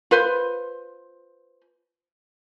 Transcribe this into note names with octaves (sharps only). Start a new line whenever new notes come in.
F4 B4 C5